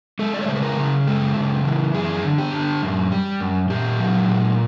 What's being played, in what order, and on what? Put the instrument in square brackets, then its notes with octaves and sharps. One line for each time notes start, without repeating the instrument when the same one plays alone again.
[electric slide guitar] G#3 A4
D5
C#5
C#3 C5
B4
A#4
C#3
G#3 A4
C#3
E3
F#2 G#4
D3
G4
D3
F#2
G3
F#2
A#2 G4
F#3
A#2